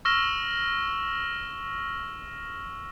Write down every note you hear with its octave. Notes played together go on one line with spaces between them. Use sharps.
C#6 E6 F6 A#6 E7 G7